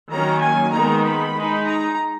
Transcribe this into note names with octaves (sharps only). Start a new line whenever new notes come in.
D#3 F#3 A#3 C#4 A#5
G#5
D#3 G#3 B3 D#4 A#5
B5
G#3 D#4
A#5